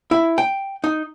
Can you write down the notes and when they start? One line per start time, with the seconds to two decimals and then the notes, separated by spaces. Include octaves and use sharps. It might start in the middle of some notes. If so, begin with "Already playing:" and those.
0.11 E4
0.38 G5
0.84 D#4